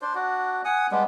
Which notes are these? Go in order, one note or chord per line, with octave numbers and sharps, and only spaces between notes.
D4 C5
D4 F#4
F#5 G#5 D#6
G3 G#3 B3 D4